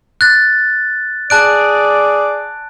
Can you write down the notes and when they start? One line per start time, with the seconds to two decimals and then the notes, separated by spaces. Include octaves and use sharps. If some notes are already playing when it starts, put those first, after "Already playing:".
0.21 F#6 A6
1.30 G#4 D5 A5 F#6 D7